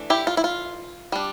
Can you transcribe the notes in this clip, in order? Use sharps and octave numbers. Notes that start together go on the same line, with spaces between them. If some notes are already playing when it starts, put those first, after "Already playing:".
Already playing: E3 A3 D4
E4 G4
F4
E4
F4
G3 D4